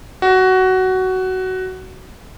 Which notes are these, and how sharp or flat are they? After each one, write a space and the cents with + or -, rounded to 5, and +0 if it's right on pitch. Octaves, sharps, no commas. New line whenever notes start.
F#4 +15